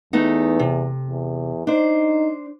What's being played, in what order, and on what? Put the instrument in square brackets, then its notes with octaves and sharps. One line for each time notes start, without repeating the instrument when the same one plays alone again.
[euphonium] E2 [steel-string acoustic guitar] A3 B3 D#4
[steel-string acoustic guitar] C3
[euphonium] E2
[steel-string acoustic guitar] D4 C5 [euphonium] D#4